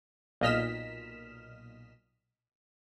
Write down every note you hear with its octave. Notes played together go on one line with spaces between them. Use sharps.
B1 A#2 D#5 F6 B6 E7